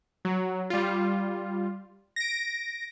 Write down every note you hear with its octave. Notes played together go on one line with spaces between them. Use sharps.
F#3
G3 F4
A#6 D7